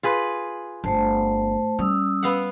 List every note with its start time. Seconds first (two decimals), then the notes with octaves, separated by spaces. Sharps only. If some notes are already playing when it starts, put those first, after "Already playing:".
0.03 F4 G#4 B4
0.84 G1 A3 C5 A5
1.79 G3 C#4 D#6 E6
2.23 B3 F5 F#5